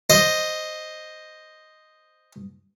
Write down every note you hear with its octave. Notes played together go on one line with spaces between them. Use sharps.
C5 D#5